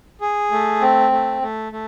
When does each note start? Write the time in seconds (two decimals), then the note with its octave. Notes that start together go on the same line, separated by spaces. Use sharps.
0.21 G#4
0.51 A3
0.81 C4
1.12 A3
1.42 A3
1.72 A3